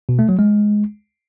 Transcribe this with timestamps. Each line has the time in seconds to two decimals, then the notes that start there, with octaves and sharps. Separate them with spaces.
0.09 B2
0.19 A3
0.29 F#3
0.39 G#3